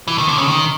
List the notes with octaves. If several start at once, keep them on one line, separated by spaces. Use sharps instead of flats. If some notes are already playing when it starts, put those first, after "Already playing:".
E3
D#3
D3
C#3
D#3